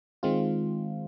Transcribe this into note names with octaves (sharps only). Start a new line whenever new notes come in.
D#3 G#3 C4 F4